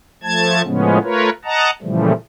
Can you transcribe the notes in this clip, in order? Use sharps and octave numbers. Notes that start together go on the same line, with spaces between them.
F3 A3 A5 G#6
A2 C#3 F3 G#3 B3 C#4
A3 F4 A#4 B4 C#5
D#5 F#5 A5 A#5
A#2 C#3 E3 F3 G3 A3